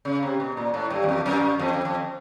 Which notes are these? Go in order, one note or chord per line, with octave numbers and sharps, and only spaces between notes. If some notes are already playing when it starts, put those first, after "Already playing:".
C#3
C3
B2
A#2
A2
G2
E2
F2
F#2
F#2
F2
F2
F2